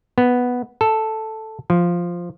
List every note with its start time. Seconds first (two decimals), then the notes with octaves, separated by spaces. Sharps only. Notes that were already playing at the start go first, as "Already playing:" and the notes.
0.18 B3
0.81 A4
1.70 F3